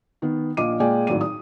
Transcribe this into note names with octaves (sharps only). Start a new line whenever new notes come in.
D#3 B3
A#1 A#2 D#5 D6 D#7
A#2 G#3 A#3 D5 G5 G#5
G#1 A2 F#3 D5 D#7
D#6